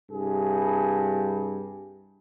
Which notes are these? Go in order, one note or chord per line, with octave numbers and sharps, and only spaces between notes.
C2 G2 G#4